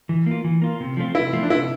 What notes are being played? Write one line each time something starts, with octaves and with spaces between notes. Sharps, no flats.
E3
A#3 F4
E3
A#3 F4
C3
F3 A3 C4 F4
C3 E4
F3 A3 C4 F4
D4
C3 E4